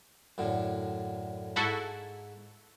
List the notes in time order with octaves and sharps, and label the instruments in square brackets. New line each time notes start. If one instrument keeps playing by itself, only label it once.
[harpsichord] F#2 A2 D3
[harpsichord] G#2 [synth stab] E4 F#4 A4